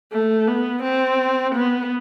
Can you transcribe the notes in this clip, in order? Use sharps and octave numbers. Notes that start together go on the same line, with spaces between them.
A3
B3
C4
B3